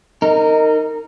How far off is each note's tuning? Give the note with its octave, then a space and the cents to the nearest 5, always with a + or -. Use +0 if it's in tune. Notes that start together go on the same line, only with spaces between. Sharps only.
D#4 +0 A#4 -20